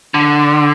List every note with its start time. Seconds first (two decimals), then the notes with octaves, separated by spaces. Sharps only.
0.14 D3